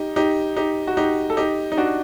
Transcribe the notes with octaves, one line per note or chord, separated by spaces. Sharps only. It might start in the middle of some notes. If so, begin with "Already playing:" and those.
Already playing: D#4 G4
D#4 G4
D#4 G4
F#4
D#4 G4
A4
D#4 G4
D#4
D4 F#4